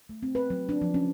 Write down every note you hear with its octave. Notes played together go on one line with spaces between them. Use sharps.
A3
C4
B4
F#3
D4
F3
C#4